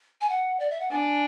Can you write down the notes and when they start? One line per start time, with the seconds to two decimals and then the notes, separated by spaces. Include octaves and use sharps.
0.21 G#5
0.29 F#5
0.60 D5
0.71 E5
0.80 F#5
0.91 D4 G#5